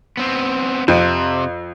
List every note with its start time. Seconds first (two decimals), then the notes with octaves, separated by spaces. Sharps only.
0.17 B3 C4
0.88 F2 C3